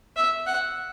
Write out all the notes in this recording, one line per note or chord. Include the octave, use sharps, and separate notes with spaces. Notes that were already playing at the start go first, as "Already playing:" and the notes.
E5
F#5